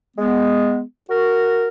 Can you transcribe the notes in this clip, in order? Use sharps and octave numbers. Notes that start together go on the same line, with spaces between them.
G#3 B3
F#4 A#4